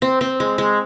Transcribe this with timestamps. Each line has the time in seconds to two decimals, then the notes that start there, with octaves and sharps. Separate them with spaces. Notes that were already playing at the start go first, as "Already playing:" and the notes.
0.02 C4
0.21 C4
0.40 G#3
0.58 G#3